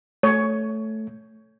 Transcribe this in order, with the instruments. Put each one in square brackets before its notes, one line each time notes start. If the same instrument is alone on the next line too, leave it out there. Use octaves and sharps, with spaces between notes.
[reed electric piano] A3 [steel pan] C#5